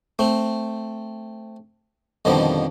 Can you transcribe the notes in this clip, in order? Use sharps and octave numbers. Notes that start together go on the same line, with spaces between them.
A3 C4
F2 B2 D3 D#3 F3 G3